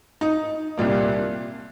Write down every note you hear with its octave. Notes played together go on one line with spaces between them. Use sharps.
D#4
C2 A#2 G3 A#3